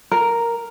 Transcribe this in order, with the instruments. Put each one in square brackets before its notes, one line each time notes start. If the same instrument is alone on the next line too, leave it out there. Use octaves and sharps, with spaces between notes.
[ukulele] A#4